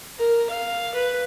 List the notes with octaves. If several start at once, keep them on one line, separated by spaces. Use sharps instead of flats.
A#4
F5
B4